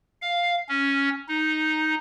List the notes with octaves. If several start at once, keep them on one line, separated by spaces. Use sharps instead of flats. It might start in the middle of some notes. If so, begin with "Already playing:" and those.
F5
C#4
D#4